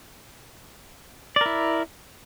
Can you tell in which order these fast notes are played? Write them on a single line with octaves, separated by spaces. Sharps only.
D5 A#4 E4